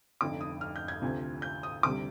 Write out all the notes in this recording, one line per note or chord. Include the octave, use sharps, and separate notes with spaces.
F1 F2 D3 D6
D#6
F6
G6
G#6
D2 C3 F3
G6
D#6
D2 C3 G3 D6